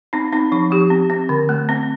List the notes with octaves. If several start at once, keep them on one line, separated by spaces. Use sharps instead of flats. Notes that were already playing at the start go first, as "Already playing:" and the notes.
C4 D#4
C4 D#4
F3 D#4
F3 G4
C4
C4
D3
A3
C4